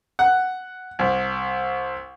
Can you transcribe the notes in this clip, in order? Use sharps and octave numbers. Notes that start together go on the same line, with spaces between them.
F#5
C2